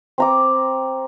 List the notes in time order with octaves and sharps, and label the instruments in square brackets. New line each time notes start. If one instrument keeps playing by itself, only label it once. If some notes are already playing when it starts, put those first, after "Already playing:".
[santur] C4 A#5 D6